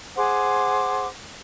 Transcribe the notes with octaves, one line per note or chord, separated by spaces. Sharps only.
G#4 C5 F#5 D6